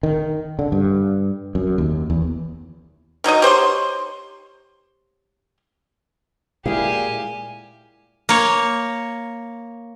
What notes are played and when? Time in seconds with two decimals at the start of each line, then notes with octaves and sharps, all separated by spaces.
0.03 D#3
0.59 D3
0.72 G2
1.55 F#2
1.78 D#2
2.10 E2
3.24 D#3 F#3 D#4 D#5
3.42 G4 C5 C#5 C6
6.66 A#2 G#3 E4 G4 G#4 F5 G#5
8.29 A#3 C#5